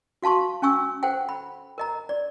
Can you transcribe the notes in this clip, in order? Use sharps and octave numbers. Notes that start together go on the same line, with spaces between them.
F#4 F5 A5 C6 C#6
C#4 G#5 C#6 E6
A4 C5 F#5 G5
B5
A#4 D#5 A#5
D5